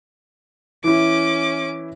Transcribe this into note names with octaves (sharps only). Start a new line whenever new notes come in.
E3 C#4 E4 D6